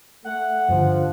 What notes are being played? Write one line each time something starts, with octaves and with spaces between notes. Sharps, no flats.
A3 F#5
G2 D3 F3